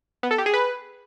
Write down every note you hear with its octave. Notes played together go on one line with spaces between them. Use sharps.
B3
A4
G4
G#4
B4